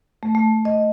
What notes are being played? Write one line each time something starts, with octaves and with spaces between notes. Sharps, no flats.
A3
A3
D#5